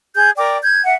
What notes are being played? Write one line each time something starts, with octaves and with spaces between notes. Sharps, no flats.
G#4 G6
A#4 D5 G5 D6
G6 G#6
E5 F#5